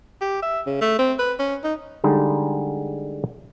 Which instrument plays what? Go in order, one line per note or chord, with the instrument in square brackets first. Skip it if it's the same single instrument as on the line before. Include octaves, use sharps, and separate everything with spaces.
[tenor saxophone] G4
E5
C#3
A3
C4
B4
C#4
D#4
[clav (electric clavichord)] D3 G3 G#3 D#4